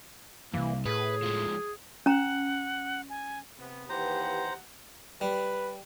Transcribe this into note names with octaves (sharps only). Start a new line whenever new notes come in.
C2 F#2 E3 A#3
A2 G#4 B4
F3 G#3
C#4 F#5 A#5
G#5
C3 B3
D#2 E3 G4 B4 C5 F#5 A#5
G3 B4